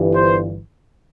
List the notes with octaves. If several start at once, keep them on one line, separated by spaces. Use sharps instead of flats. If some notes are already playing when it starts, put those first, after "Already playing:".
Already playing: G1 G2 E3
C5